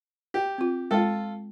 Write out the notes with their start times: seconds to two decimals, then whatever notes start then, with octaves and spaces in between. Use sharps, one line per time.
0.34 G4
0.58 C4 F4
0.91 G#3 F4 A4 G5